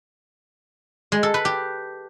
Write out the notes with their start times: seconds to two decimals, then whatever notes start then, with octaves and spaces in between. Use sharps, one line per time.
1.12 G#3
1.23 A4
1.34 B4
1.45 G4